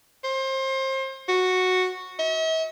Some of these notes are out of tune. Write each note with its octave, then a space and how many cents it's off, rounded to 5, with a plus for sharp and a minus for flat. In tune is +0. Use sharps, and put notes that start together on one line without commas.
C5 +30
F#4 -5
E5 -45